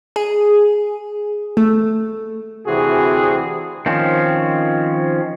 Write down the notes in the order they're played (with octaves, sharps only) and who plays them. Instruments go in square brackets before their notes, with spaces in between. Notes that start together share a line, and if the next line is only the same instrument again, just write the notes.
[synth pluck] G#4
A3
[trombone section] D2 C3 E3 C4 F#4 G#4
[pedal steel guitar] D#3 F3 C4 C#4